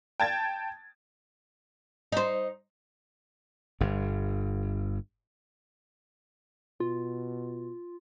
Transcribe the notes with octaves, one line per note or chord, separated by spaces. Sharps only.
G5 A5 G#6 A6
D#4 C5
G1 G2
B2 F4